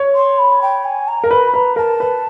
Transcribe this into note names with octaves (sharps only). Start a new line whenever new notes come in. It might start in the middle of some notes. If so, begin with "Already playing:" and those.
Already playing: C#5
C6
B5
G5
G#5
A#5
A#4
B4 B5
B4 A#5
A#4 A5
B4